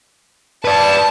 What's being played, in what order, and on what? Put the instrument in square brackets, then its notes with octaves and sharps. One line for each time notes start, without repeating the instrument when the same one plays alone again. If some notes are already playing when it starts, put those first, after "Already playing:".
[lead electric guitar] B4 D5 [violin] A5